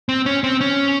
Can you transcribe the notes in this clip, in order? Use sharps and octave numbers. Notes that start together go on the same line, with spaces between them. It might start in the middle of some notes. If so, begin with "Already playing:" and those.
C4
C#4
C4
C#4